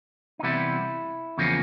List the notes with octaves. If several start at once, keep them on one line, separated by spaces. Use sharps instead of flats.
D#4
C3 E3 G3 B3 E4
E2 C#3 F3 A#3 C#4